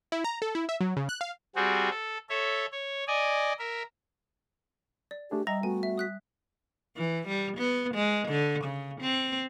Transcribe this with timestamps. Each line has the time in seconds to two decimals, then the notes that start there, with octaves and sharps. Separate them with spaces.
0.12 E4
0.24 A#5
0.42 A4
0.55 E4
0.69 E5
0.81 F#3
0.97 C#3
1.09 F#6
1.21 F5
1.56 G3 C4 F#4 G#4
1.90 A4
2.30 A4 C#5 E5
2.72 C#5
3.07 D5 D#5 G#5
3.59 A#4 E5
5.11 D5
5.31 A3 D4 G4 G#4
5.47 G3 D#5 E5 A#5
5.63 A3 B3 F#4 G#5
5.83 E5
5.98 D#6 F#6 B6
6.97 E3
7.28 G3
7.57 B3
7.95 G#3
8.28 D3
8.65 C#3
9.01 C4